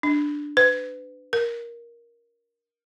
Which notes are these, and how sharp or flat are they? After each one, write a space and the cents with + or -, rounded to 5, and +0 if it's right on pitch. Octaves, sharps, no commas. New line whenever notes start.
D4 +0
B4 +30
A#4 +10